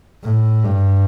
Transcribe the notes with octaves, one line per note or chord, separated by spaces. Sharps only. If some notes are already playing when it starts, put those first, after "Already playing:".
A2
G2